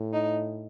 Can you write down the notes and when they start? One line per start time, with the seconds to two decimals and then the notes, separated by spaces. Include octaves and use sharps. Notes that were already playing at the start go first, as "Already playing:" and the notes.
Already playing: A2
0.13 D#4